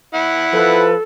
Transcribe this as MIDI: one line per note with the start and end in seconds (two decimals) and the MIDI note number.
0.14 0.83 64
0.14 0.83 78
0.53 0.94 53
0.53 1.02 69
0.53 0.94 71